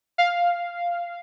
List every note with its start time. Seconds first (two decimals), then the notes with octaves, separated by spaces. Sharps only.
0.18 F5